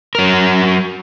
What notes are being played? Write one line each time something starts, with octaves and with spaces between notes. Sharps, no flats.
F#3 A#4